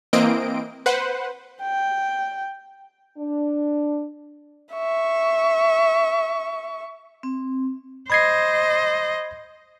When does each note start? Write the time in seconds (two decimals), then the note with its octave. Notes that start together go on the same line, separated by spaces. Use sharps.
0.13 E3 A#3 C4 D#5 D7
0.86 B4 C5 F#5
1.62 G5
3.18 D4
4.74 E5 C#6
7.23 C4
8.10 C5 D#5 B5 G#6 C7